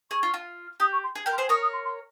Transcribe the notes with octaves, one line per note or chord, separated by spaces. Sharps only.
G#4 C#6
F4
F4
G4 D#6
C#6
C6
G#4
G4 A#4
C6
G#4 C5
A#4 C#5 D#6
D#6
C6
C6